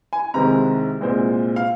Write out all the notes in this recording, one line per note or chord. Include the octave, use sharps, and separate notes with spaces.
G#5
C2 C3 D#3 G#3 C4 A#5
C2 A#2 G#3 C4
F5